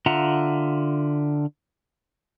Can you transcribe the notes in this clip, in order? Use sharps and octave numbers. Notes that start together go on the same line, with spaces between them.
D3 F4 E5 F#5 A#5